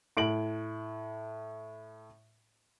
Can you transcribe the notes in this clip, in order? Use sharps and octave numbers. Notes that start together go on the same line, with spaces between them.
A2 D7 F#7